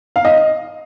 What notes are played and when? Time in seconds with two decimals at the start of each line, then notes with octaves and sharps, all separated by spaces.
0.16 F5
0.25 D#5